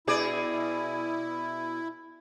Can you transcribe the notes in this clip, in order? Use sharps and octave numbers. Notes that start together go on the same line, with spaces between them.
B2 E4 G#4 D5